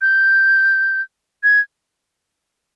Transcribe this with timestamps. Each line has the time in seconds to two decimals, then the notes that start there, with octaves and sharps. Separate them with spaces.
0.02 G6
1.43 G#6